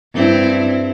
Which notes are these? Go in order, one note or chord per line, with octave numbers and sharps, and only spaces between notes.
G2 C4 E4